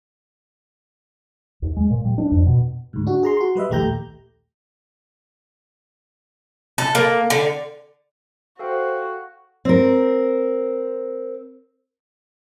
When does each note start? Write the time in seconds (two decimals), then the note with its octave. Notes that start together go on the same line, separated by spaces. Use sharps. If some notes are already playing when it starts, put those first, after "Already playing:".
1.62 D#2
1.76 G#3
1.90 A#2
2.05 G3
2.18 D4
2.31 F2
2.46 B2
2.93 D2 G#2
3.07 D4 F#4
3.23 G#4 A#5 C6
3.37 F#4 C6
3.55 G3 B4 D#5 E5
3.69 A#1 D#2 A3 G4 A#5 G6
6.78 A4
6.95 A#3
7.30 D3
8.59 F#4 A4 C5 F5 G5
9.65 C4 A#4